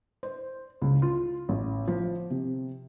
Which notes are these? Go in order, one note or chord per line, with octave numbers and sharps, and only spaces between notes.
C5
C#2
F4
A1
F3
C3